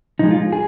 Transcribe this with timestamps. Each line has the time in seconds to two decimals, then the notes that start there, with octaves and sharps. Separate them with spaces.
0.19 D3 F3 G#3 D#4
0.31 F4
0.53 G#4